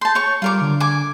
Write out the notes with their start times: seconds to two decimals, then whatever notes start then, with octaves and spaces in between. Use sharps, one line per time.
0.01 A5 C6 G6
0.15 C#5 C#6
0.42 G3 F4 A#4 D6
0.61 D3
0.80 G#5 D6